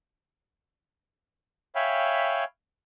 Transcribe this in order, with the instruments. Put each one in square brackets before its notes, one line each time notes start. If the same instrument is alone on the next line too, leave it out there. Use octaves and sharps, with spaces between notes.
[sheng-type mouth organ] C#5 E5 F5 G5 G#5 B5